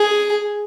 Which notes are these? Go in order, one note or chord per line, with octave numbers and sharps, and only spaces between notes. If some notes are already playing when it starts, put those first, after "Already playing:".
Already playing: G#4